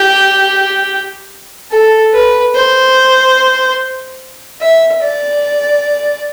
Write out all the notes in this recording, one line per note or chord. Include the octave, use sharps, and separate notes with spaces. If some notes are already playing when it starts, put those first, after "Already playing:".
Already playing: G4
A4
B4
C5
E5
D5